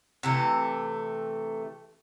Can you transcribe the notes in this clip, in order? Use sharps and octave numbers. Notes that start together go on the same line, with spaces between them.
C3 E3 A3